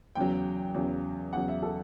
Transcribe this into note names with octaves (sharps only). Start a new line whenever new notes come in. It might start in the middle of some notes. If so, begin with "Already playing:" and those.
E2 C#3 F#3 G5
E2 C#3 F#3
E2 C#3 F#3 F#5
E5
A4